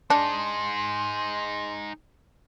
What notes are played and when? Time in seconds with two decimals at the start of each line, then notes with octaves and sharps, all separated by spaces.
0.10 D4 D#4 G#4 C6